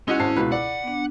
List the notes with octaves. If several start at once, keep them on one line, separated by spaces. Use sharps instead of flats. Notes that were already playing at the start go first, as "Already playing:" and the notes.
G#3 C#4 D#4 E4 F#4
G#1 A5 C7
C#2 B2 B4
D5 F#5
B3 D4